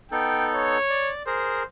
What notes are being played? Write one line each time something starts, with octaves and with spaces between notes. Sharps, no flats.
B3 D#4 A4 G5
C#5
D5
G#4 A#4 C5